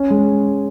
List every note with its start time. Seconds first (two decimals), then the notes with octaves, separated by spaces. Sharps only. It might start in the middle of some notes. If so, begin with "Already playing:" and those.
Already playing: C#4
0.10 G#3